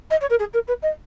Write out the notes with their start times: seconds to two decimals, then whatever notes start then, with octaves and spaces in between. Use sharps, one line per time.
0.10 D#5
0.21 C#5
0.30 A#4
0.39 G#4
0.53 A#4
0.67 B4
0.82 D#5